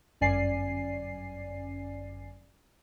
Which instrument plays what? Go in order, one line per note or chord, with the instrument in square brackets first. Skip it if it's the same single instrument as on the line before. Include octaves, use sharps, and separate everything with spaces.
[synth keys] G1 F#2 C#4 D5 G#5 C7